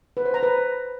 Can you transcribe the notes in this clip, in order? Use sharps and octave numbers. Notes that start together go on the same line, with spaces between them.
B4
C5
A#5
B4